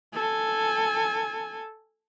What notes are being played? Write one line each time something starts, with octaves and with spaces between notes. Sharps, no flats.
A4 G#5